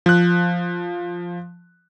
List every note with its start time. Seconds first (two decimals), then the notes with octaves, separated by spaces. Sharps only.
0.06 F3 F#6